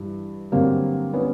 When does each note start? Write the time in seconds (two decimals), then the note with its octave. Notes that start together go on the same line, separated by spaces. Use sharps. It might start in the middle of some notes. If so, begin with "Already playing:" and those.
Already playing: G2 E3
0.52 G2 D3 F#3 A#3 C4
1.13 B3 C#4